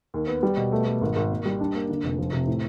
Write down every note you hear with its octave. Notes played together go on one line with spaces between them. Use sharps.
D#2
B3
G3
B2
A3
A3
G#1
G#1
A#3
G3
D4
A#3
D3
F1
F3
C3
A2